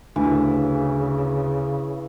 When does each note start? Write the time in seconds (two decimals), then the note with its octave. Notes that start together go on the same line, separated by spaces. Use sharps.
0.16 D2 C#3 E3